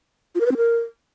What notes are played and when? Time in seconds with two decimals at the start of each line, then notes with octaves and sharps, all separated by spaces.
0.35 F4
0.40 A#4
0.46 B4
0.51 C4
0.57 A#4